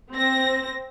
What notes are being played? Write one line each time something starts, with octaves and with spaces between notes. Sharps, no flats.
C4 A#6